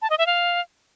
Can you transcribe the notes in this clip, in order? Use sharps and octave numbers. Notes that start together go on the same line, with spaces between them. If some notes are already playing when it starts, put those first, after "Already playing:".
A5
D#5
E5
F5